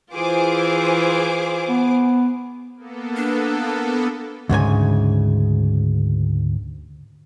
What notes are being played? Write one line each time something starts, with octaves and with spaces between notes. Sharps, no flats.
E3 F4 G#4 C5 D6
B3
A#3 B3 A4
D4
D2 G#2 C#3 G#5